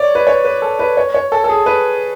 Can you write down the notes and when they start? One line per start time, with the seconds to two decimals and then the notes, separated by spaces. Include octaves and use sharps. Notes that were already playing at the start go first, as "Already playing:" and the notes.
Already playing: C#5 D5
0.15 B4
0.27 C#5
0.45 B4
0.62 A4
0.79 B4
0.97 C#5
1.14 C#5
1.32 A4
1.44 A4
1.49 G#4
1.66 B4